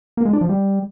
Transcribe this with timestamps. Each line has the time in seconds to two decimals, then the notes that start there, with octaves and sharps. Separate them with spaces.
0.17 A#3
0.25 G#3
0.33 D4
0.41 F3
0.49 G3